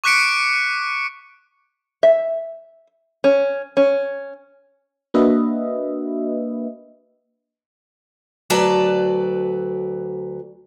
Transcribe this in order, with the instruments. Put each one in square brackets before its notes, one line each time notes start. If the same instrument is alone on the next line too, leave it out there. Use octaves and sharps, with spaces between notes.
[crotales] C#6 D6 F#6 B6 C#7 D7
[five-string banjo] E5
C#4
C#4
[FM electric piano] A#3 D4 F#4 B4 D#5 E5
[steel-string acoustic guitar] D2 F#3 B4 D5 A5